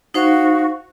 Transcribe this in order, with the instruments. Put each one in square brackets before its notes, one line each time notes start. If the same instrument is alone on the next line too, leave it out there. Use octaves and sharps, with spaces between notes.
[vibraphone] D#4 C5 F5 [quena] F#4